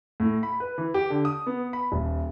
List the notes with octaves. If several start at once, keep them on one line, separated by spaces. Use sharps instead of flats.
A2
B5
B4
E3
G4
D3
D#6
B3
B5
D#1